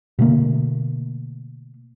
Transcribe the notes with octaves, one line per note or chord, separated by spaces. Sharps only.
B2 D3 A3 A#3